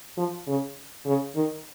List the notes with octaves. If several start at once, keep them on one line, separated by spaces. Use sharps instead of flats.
F3
C#3
C#3
D#3